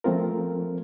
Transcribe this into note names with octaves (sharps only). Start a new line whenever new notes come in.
F3 A3 C4 F4 A#4